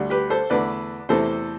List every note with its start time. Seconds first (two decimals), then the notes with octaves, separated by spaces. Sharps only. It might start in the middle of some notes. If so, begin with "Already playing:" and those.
Already playing: D2 D3 G3
0.10 G4 B4
0.30 A4 C5
0.50 E2 D3 A3 B4 D5
1.09 E2 C3 E3 A3 A4 C5